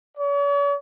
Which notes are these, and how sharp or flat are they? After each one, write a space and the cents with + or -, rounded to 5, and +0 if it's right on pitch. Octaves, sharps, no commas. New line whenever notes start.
C#5 +45